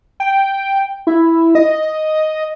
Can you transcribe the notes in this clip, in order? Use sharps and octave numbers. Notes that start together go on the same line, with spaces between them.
G5
E4
D#5